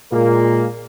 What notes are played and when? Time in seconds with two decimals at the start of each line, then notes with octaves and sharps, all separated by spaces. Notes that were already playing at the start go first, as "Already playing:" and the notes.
0.12 A#2 G#3 A#3